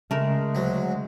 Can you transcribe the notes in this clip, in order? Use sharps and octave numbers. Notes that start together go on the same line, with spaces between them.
C#3 G#3 A3 A#4
D2 F#3